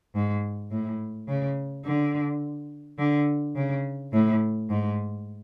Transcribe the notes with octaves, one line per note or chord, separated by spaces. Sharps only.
G#2
A2
C#3
D3
D3
C#3
A2
G#2